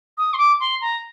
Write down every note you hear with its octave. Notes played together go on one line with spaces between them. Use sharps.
D#6
C6
D6
C6
A#5